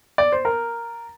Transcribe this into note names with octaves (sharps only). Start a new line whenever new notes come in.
D5
C5
A#4